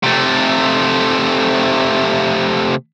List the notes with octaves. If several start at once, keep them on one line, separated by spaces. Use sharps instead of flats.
C3 A3